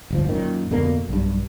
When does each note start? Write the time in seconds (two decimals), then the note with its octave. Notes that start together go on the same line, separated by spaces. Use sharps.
0.10 D1 G1 F3
0.29 F#2 A#2 D#3
0.71 F2 B2 D3 A#3
1.09 B1 G2